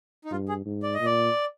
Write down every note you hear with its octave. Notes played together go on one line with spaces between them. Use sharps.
D#4
G2 F4
G#4
G#2
D5
D#5
A#2
D5